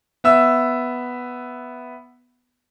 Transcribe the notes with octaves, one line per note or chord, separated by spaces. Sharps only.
B3 E5 E6